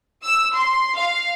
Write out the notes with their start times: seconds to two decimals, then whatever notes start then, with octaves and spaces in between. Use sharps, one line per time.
0.23 E6
0.53 C6
0.95 F5